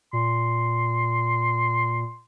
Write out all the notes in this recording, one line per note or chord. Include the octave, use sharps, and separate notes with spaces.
A#2 C6